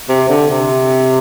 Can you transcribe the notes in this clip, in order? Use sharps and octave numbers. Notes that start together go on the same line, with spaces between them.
C3
D3
C3